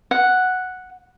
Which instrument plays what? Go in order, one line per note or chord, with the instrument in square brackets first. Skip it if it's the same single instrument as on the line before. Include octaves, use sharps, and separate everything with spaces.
[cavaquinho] F#5